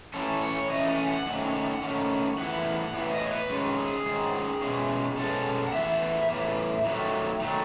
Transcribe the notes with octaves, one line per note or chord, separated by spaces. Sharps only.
E3 A3 C#4 A4
C#5
E3 A3 C#4 D#5
G#5
F#5
D#3 A3 C#4
D#3 A3 C#4
A2 E3 B3 F#5
A2 E3 B3
D#5
C#5
B4
D#3 G#3 C#4
G#4
D#3 G#3 C#4
B2 G#3 C#4
B2 G#3 C#4 A4
F#5
A2 E3 B3 E5
A2 E3 B3
D#3 F#3 A3
D#3 F#3 A3